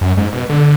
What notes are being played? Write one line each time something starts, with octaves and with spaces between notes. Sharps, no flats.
F#2
G#2
B2
D3